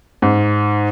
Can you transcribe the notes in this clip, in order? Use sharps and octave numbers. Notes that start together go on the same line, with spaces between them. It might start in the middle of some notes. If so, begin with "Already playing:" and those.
G#2